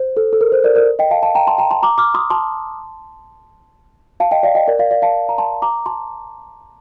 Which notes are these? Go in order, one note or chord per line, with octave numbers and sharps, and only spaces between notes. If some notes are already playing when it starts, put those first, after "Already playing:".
Already playing: C5
A4
A4
A#4
C5
A#4 D5
A#4 D5
D#5 G5
F5 A5
F5 A5
G5 A#5
A5 C6
G5 A#5
A5 C6
A#5 D6
D6 F6
C6 D#6
A5 C6
F5 A5
D#5 G5
D5 F5
D#5 G5
A#4 D5
D5 F5
D5 F5
F5 A5
A#5
A5 C6
A#5 D6
A5 C6